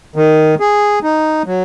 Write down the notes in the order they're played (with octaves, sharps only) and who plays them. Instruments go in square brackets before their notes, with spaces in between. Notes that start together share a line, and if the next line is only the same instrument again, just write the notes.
[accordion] D#3
G#4
D#4
F#3